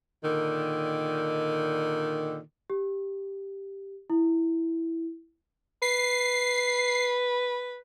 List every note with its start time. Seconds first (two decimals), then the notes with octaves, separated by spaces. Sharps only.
0.23 A#2 D3 D#3
2.70 G4
4.10 E4
5.82 B4 C7